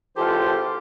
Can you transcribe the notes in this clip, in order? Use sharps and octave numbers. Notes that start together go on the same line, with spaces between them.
G#1 E3 F4 G4 A4 C5